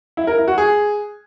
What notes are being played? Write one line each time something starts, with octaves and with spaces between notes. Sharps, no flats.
E4
A#4
E4
F#4
G#4